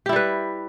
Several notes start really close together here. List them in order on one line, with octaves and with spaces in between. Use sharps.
G4 E4 G3 B4